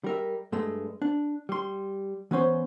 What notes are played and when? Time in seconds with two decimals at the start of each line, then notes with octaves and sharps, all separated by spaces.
0.04 G3 A#4 E5
0.52 G2 G#3 A3
1.02 D4
1.49 G3 C6
2.31 E3 B3 C#4 C5